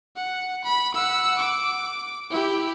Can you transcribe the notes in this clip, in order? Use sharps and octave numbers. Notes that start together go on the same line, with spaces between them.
F#5
B5
F#5 E6
D6
E4 G4